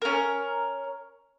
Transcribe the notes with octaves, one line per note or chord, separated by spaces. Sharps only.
C#4 A#4